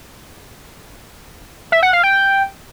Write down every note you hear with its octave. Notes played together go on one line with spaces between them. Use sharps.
E5
F#5
F5
G5